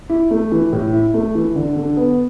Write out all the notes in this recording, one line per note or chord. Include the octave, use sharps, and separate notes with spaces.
E4
A3
E3
A2
E4
A3
E3
D3
D3
B3